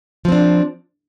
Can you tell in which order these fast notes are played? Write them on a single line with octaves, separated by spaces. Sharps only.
F3 C4 D4